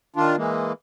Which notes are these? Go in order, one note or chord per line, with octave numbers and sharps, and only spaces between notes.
D#3 D4 F4
E3 G#3 A#3